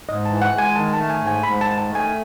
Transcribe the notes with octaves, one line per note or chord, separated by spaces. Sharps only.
G#2 D#5
E3 A5
F#5
G#3 G#5
D#3 A5
A3 A5
G#5
G#2
G#5
G#2 B5
A5
D#3
A5
A3
G#5